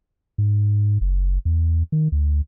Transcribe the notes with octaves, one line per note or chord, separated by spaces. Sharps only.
G#2
F#1
E2
D#3
D2